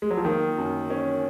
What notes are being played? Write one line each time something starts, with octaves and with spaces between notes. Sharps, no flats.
G#3
F#3
F3
D#3 A#3
F#2
C#4